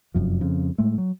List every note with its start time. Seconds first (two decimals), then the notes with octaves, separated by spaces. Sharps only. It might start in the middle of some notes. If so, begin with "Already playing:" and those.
0.14 F1 F#2 F3
0.41 F2 C#3
0.78 A2 G#3 A3
0.98 F#3